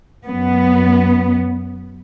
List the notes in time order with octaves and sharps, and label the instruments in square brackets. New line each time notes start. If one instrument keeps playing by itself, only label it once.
[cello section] F#2 B3